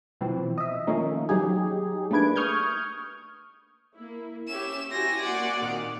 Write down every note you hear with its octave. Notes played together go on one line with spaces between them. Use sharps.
B2 E3 F3 C4
D#5 E5
D#3 F3 A3 A#3 C#4 D#4
F#3 D#4 G4 G#4
A3 A#3 D4 B4 G#6 D7
C#6 D#6 F6 G6 G#6
A#3 E4
C#4 G4 E5 E7
E4 F#4 G4 G5 G#5 C6 A#6
A#3 F#4 D5 F#5
A#2 D#3 C4